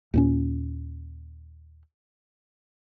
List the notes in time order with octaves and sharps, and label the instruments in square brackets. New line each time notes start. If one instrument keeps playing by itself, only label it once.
[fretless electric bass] D#2 A#2 C#4